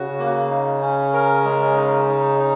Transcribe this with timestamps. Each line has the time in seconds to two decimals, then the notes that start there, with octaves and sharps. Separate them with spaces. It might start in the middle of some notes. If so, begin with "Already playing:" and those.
Already playing: C#3 F#4
0.19 A#3
0.50 D#4
0.82 C#4
1.14 A#4
1.44 G#3
1.76 D#4
2.08 D#4
2.39 D#4